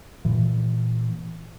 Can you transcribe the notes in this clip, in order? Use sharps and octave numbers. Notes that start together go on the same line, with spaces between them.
A#2 E3